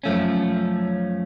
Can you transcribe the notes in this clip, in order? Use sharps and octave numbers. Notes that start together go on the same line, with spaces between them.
F#2 F3 A3 C#4